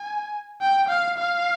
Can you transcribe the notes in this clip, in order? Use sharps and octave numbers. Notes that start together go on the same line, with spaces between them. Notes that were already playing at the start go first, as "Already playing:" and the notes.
Already playing: G#5
G5
F5
F5